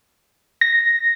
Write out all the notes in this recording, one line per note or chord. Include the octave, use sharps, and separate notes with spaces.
A#6